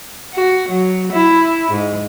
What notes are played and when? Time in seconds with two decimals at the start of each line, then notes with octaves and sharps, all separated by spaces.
0.34 F#4
0.69 F#3
1.12 E4
1.71 G#2